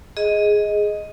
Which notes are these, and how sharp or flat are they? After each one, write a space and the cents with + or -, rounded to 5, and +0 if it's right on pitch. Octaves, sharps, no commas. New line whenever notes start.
G#4 +0 D#5 +5